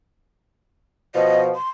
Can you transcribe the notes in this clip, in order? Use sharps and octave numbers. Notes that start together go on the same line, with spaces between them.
B2 F3 D#5
C6